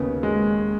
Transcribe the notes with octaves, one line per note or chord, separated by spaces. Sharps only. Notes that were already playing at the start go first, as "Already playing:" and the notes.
Already playing: D#2 C#3 B3
G#3